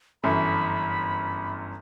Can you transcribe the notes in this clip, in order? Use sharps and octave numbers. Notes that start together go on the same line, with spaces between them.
G1 F#2 E3 B5